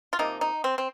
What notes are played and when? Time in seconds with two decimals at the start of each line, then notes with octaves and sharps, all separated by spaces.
0.13 F4
0.19 C3 F3 A#3 D#4
0.41 D#4
0.64 C4
0.78 C4